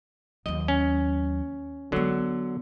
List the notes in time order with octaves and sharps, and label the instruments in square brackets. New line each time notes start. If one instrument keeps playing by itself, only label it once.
[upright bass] D#2 F#3 [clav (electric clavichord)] D#5
[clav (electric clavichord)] C#4
[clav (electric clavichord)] D3 F#3 [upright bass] G#3 B3